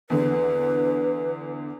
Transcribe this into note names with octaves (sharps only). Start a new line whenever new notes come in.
E2 D3 B4